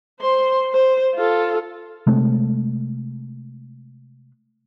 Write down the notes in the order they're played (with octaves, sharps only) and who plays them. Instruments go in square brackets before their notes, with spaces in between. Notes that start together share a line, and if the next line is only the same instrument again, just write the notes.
[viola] C5 C6
C5
F4 A4
[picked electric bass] C3 G#3 A3